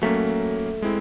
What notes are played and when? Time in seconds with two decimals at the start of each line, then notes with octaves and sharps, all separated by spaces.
0.02 F#3 A3 A#3 C#4
0.82 G#3 C4 E4